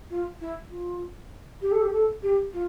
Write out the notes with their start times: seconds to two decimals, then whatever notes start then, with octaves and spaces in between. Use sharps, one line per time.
0.10 F4
0.40 E4
0.70 F4
1.61 G4
1.71 A4
1.81 G4
1.92 A4
2.22 G4
2.52 F4